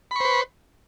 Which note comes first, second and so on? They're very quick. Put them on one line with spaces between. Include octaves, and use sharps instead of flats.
B5 C#6 C5 B4